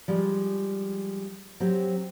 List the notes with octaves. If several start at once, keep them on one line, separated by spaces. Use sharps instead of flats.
F3 G3 G#3
F#3 C4 G4